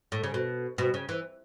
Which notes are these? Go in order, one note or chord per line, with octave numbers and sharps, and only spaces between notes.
A2
C#3
B2
B2
C#3
E3